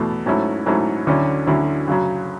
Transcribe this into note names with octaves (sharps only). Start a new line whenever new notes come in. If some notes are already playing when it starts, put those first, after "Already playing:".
Already playing: E2 B2 A3
G#2 F#3 A3 C#4 E4
G#2 F#3 A3 C#4 E4
D2 D3 F#3 C#4 E4
D2 D3 F#3 C#4 E4
F#2 C#3 F#3